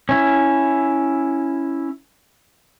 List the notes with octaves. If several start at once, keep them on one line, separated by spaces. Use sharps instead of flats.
C#4 E4